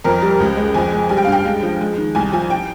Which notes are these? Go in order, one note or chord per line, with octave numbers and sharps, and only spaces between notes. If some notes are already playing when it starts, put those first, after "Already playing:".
F2 A#4
G3
C#2
G#3
F2 G#5
G#3
G3 G#5
G5
G2 F5
G5
G#3
F3
G#3
D#3
C2 G#5
F3 G#5
G5